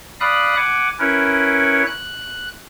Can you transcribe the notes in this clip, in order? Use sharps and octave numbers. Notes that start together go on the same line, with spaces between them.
D5 F5 B5 D#6 F#6
F#5 G#5 D6
C#4 E4 A#4 B4 C#5
F#6